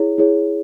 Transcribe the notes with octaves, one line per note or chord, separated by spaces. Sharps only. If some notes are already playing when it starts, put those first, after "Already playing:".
Already playing: E4 G#4 C#5
E4 G#4 C#5